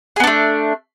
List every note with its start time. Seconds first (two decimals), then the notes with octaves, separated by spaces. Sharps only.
0.16 G#4
0.20 B3
0.24 D4
0.27 A3